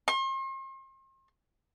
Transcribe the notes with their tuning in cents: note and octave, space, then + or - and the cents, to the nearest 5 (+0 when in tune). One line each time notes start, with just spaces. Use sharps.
C6 +40